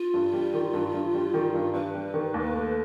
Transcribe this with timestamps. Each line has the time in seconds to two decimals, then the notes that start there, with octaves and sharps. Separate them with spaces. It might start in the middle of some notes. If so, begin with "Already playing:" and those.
Already playing: F4
0.14 G2
0.33 G3
0.54 D#3
0.74 G2
0.94 G2
1.14 G3
1.34 D#3
1.54 G2
1.73 G2 B4
1.94 G3
2.14 D#3
2.34 D#2
2.53 A3